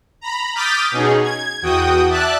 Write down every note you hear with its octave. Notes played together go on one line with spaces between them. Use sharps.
A#5 B5
D6 D#6 F6 G6 A6 B6
B2 C#4 D#4 G#4
G#6
E2 F#4 G5 D#6
D5 E5 A5 F#6